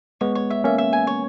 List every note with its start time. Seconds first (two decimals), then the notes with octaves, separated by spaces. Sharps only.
0.21 G#3 B3 C#5
0.35 C#5
0.50 E5
0.64 A#3 C#4 E5
0.78 E5
0.93 G#5
1.07 C#5